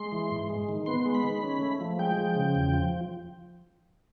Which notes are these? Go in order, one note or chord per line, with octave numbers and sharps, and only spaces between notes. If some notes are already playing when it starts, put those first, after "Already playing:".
Already playing: G#3 C6
E3
G#2
G#3
D#3
B3 C6
G#3
B5
D#3
C#4
A3
F3
G#3 G5
F3
C#3
E2
F3